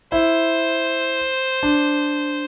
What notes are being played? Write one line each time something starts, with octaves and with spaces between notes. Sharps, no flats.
E4 C5
D4